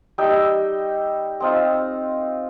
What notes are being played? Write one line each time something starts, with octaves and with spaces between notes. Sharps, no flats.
G3 D#4 E5 G5
C4 D#4 F4